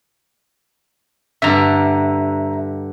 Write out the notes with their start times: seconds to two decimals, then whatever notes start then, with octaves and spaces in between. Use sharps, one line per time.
1.42 G2 D3 E5 A#5